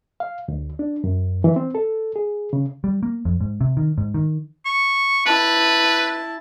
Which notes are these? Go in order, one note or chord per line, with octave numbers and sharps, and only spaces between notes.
F5
D2
D4
F#2
E3
C4
A4
G#4
C#3
G3
A#3
F2
G#2
C3
D#3
G#2
D#3
C#6
E4 B4 A5